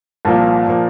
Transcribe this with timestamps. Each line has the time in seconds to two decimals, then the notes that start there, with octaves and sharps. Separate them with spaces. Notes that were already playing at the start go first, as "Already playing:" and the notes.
0.25 C2 A#2 F3 A#3 A5
0.67 A#2 F3 A#3